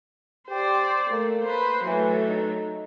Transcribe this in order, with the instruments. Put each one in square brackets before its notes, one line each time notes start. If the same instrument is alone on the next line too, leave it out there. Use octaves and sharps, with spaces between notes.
[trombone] G4 [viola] C5 D5
[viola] A3 [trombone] A#3
[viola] B4 C5
[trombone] E3 [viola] F#3 A3
[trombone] D#4